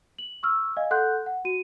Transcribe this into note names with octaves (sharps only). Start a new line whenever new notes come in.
F#7
C#6 E6 F6
D#5 F5 G#5
A4 F#5 C6 F#6 G6
F#5
F#4 D#7